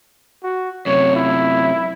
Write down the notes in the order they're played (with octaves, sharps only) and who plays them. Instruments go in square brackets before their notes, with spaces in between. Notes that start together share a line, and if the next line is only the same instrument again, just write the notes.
[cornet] F#4
[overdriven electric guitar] F#2 C3 [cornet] C#5
[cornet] E4